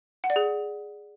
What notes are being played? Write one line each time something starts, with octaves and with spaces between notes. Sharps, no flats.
F#5
D5
G#4